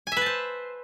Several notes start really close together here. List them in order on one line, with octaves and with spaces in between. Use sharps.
G#5 E5 B4 A5 C5